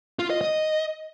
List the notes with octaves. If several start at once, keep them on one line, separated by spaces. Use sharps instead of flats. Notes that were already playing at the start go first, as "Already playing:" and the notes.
F4
D#5
D#5